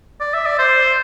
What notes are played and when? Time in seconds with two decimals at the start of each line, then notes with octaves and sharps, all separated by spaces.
0.21 D5
0.34 E5
0.46 D5
0.58 C5